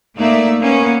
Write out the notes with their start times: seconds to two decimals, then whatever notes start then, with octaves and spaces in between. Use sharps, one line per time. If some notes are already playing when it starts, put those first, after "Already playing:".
0.17 A3 A#3 D#4 D5 E5
0.59 A#3 B3 C#4